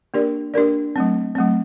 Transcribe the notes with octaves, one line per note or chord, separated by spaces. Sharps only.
A#3 D4 G4 A#4 D5
A#3 D4 G4 A#4 D5
F#3 A3 C4
F#3 A3 C4